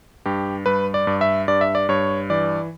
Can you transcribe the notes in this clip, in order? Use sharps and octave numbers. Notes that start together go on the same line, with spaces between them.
G2 G4
G2 B4
D5
G2
E5
G2 D5
E5
D5
G2 C#5
E3 D5